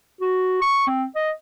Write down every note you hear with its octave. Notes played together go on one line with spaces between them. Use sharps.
F#4
C#6
C4
D#5